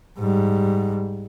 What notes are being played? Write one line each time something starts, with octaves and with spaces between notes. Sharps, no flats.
G#2 G3